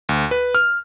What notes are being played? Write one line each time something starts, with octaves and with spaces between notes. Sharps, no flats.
D2
B4
F6